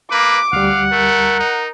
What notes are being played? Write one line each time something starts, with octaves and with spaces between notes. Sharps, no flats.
A#3 B4 D6
D2 G3 F5 F#5
A3 A#4
D#4